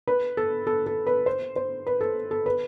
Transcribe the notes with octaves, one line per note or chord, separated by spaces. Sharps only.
B4
A4
A4
A4
B4
C5
C5
B4
A4
A4
B4